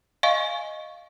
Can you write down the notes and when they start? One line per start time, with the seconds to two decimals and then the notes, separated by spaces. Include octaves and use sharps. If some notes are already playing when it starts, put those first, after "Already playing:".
0.23 D#5 F5 G#5 C#6